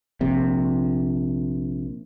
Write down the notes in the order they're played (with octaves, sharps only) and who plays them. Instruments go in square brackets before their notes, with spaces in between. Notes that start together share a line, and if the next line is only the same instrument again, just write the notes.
[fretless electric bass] A#1 C3